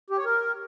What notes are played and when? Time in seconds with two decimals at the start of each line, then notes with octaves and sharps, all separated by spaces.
0.10 G4
0.18 C#5
0.25 A#4